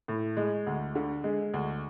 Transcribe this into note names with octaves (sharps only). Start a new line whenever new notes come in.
A2
G#3
D2
D3
G#3
D2